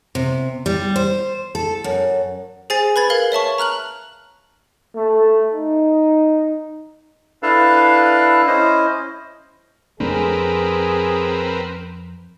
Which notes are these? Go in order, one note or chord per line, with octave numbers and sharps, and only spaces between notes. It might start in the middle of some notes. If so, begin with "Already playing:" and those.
C3
G3
C5
A4
F#2
G#4 C5 G#5 A6 C7
B4 B5 G#6 A6
A#4 F5 F#7
C#5 E5 A5 C#6
A#5 F6 F#6 F#7
A3
D#4
D4 E4 A4 B4 F5 A5
C#4 E4 C5 D#5
F2 A3 C4 D4 G#4 A#4 B4